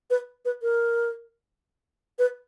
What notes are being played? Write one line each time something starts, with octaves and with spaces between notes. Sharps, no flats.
B4
B4
A#4
B4